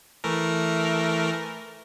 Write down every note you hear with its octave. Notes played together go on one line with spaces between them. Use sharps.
E3 A3 A#4